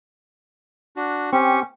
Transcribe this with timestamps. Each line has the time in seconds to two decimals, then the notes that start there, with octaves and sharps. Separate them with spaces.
0.96 D4 F#4
1.33 C4 C#4 G4 C#6